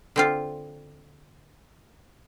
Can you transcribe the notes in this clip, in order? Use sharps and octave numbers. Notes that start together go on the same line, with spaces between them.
D3 C4 F4